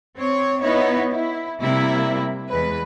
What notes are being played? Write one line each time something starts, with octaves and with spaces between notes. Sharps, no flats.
C4 C#5
B3 D#4 E4 C#5
E4
C3 G3 A#3 E4
E2 G#3 B4